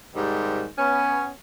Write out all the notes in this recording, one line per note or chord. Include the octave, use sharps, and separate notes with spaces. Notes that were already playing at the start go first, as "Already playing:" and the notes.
G#2 C3 D#3 G3
B3 C#4